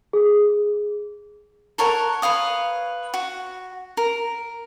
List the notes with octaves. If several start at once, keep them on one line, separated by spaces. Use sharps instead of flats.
G#4
A4 A#4 C#5 F#5
B4 C#5 F5 D#6
F#4
A#4